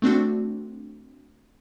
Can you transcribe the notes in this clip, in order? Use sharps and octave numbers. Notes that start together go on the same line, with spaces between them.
A3 C4 D4 F#4